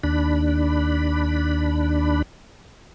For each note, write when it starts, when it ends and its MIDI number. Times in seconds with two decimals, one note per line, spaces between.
0.03 2.22 39
0.03 2.22 62
0.03 2.22 83